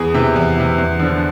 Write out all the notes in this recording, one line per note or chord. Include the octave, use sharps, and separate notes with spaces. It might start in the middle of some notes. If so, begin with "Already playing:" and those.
Already playing: E2 G#4
C3 E3
E2
C3 E3
E2
D3 F3